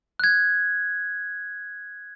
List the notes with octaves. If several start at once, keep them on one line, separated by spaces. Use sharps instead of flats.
F#6 G#6